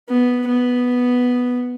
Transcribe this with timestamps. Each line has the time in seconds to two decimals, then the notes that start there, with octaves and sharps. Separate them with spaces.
0.09 B3
0.48 B3